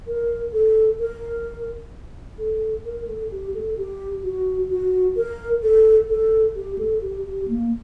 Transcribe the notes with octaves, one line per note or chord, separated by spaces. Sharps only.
A#4
A4
A#4
A4
A#4
A4
G4
A4
G4
F#4
F#4
A#4
A4
A4
G4
A4
G4
G4
A#3